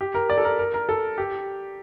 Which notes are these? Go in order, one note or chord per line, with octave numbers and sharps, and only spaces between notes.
G4
A#4
D5
A4
A#4
A#4
A#4
A4
G4